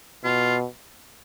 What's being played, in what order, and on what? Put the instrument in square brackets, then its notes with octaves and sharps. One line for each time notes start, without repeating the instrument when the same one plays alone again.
[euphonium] B2 [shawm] F4